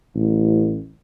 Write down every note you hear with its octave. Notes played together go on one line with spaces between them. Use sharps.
A1